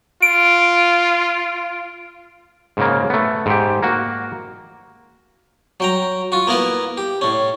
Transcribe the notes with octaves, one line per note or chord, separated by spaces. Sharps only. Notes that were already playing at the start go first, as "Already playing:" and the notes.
F4 D7
G#2 C#3 A#3
A3 B3
G#2 G4
A#3 F#4
F#3 G5 A#5
F4 F#4
A#3 B3 E4 A#4 B4
G4
A2 C#4